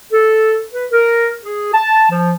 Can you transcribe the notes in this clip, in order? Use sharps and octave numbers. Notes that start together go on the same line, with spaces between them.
A4
B4
A#4
G#4
A5
F3